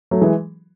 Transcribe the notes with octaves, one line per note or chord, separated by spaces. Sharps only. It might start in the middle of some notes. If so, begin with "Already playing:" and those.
F#3 A3
E3 G#3